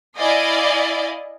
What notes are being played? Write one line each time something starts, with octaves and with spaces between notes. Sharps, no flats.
E4 D5 D#5 F5 G#5